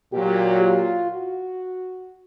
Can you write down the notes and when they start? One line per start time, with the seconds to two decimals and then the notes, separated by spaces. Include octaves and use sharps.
0.13 A#2 F#3 G4
0.62 F4
1.10 F#4